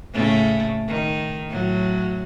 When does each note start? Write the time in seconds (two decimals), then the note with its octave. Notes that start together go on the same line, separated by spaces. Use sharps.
0.14 A2 C#3 A3
0.88 D#3
1.50 A2 F#3